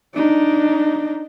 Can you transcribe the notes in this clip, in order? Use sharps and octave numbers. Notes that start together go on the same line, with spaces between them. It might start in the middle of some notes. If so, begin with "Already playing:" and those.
D4 D#4